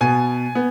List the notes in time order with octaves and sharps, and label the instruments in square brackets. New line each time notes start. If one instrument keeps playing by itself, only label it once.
[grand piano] B2 B3 G#5
B3